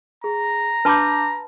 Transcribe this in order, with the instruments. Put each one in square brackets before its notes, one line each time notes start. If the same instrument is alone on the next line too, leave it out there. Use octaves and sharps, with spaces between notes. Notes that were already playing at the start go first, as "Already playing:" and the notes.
[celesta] G#4 [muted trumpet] A#5
[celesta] D4 D6 G6 [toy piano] B4 A5 B5